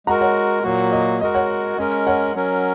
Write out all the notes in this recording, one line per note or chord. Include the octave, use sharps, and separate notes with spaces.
G#3 F#4 A#4 F#5 A#5
C#5 F#5
A#2 F#3 A#3 F#4
D#5
G#3 F#4 A#4 D#5
C#5 F#5
G#3 C#4 A#4 D#5
C#5 F#5
F#3 C#4 A#4